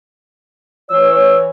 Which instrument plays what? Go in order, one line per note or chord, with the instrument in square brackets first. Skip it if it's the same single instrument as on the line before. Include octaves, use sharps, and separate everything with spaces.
[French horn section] E3 C#5 [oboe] E6